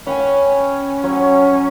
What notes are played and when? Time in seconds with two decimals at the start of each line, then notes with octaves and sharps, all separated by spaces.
0.07 C#4 B4 G5 G#5
1.03 F#3 C#5